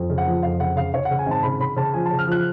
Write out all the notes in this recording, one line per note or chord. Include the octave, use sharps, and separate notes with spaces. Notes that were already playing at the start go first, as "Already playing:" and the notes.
Already playing: F2
C#3
F#5
F3
F2 F5
C#3 F#5
C#3 F5
C#3 C#5
F#5
C#3
G#5
G#1 A5
C#3 B5
C#3 B5
C#3 A5
F3 G#5
A5
C#3
F6
F3 F#6